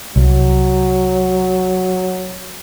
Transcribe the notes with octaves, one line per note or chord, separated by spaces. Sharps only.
C2 F#3